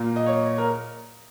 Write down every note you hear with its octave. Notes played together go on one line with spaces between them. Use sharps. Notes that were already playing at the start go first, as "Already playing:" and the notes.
Already playing: A#2 A#3
D#5
C#5
A#4